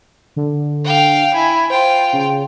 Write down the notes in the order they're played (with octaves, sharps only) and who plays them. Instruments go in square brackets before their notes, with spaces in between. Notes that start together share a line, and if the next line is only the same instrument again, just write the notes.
[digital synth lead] D3
[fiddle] F5 G5
[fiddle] E4 [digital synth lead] G#5
[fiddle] F4 G5 [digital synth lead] C5
[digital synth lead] C#3